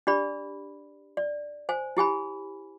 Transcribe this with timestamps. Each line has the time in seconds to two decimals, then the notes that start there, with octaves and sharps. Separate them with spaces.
0.07 D4 G4 D5 B5
1.17 D5
1.69 C5 G#5
1.97 E4 G4 G#5 B5